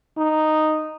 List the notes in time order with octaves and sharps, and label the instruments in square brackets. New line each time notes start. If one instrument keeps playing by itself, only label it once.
[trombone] D#4